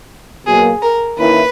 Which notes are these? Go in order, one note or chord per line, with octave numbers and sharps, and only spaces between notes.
B2 F#3 A#3 G#4
A#4
D#3 A#3 C#4 E4 B4